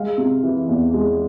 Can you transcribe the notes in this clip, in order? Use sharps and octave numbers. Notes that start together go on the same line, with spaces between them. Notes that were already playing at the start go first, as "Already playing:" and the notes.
Already playing: G#3 F5
C3
E3
E2
G#3